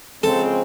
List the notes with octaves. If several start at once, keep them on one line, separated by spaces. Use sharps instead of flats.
C#3 F3 G#3 C4 A4